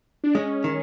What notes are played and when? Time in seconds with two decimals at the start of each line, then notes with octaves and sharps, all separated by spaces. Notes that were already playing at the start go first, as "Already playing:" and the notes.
0.24 D4
0.35 G#3 C#4
0.64 D#3